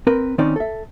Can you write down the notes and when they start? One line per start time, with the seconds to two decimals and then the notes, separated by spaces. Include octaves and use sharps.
0.07 C4 A#4 B4
0.38 D#3 C4 C#4 D#4 D5
0.56 A4 E5